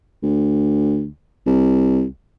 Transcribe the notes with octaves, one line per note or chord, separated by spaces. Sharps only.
D2
C2